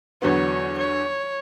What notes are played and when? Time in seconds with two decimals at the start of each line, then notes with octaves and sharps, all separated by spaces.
0.22 E2 D3 F#3 B3 C#5
0.78 C#5